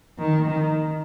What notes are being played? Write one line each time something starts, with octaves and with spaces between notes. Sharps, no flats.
D#3
D#3